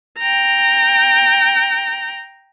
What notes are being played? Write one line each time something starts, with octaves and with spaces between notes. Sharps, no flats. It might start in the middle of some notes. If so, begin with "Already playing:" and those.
G5 A#5